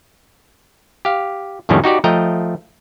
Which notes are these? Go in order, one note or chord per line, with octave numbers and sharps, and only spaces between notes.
G4 F5
F2 A2 D#3 G3 C#4
D#4 F#4 G4 D5
F3 A3 D#5 G5 A#5